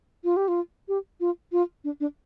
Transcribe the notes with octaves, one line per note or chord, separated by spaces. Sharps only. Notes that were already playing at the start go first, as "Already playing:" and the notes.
F4
G4
F4
G4
F4
F4
D4
D4